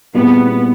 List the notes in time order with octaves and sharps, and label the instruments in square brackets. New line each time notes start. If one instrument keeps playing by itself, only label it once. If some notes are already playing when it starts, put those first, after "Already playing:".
[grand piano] A#2 G3 C4 E4 G#4 [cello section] B3